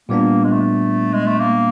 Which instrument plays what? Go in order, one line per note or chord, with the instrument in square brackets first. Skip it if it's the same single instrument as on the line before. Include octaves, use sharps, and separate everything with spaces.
[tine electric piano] A#2 G3 B3 D4 [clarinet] A#3
[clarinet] G#3
A3
G#3
A3
A#3